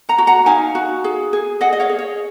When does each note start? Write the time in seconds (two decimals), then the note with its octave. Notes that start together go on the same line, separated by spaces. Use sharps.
0.09 F#5 A#5
0.18 F#4
0.27 F#5 A#5
0.46 D#4 F5 G#5
0.75 F#4
1.04 G#4
1.33 G#4
1.61 G#4 D#5 F#5
1.73 D#5
1.80 C#5 F5
1.89 G#4
1.99 C#5